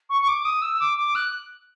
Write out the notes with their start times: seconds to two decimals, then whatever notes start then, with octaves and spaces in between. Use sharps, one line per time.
0.09 C#6
0.22 C#6
0.28 D6
0.45 D#6
0.62 E6
0.80 D6
0.98 D6
1.15 F#6